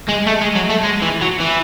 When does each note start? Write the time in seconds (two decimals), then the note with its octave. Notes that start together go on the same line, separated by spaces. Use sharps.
0.08 G#3
0.26 A3
0.41 G#3
0.55 F#3
0.69 A3
0.83 G#3
1.02 E3
1.21 F#3
1.40 E3